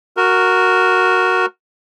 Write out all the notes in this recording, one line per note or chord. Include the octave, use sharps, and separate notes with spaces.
F#4 A#4